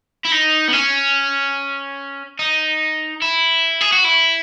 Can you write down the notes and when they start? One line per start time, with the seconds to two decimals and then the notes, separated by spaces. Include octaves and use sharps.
0.25 E4
0.32 D#4
0.68 B3
0.73 C#4
2.39 D#4
3.22 E4
3.81 G#4
3.93 F#4
4.05 E4